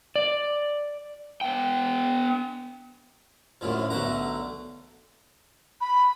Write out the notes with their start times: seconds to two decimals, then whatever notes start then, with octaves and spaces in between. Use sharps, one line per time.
0.16 D5
1.41 B3 G5
3.61 F#2 A2 D3 F3
3.90 B1 D3 A3 F#5 A#5
5.81 B5